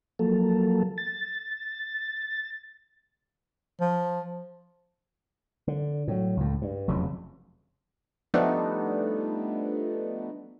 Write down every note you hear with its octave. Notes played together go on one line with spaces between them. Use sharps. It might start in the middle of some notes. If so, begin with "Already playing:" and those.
F3 F#3 A#3 A4
A6
F3
D3
A2 F#3
C#2 A2
G2
F1 F2 C#3 F#3
F3 G3 A3 B3 D4 D#4